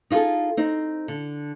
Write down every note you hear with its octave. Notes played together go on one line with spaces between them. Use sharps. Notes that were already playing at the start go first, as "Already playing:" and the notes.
D#4 F4 F#4 G#4 A4
C4 D#4
D3